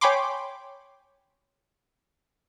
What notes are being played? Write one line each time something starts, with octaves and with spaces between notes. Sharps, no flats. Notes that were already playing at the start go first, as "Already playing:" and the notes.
C#5 G5 G#5 B5 C6 D6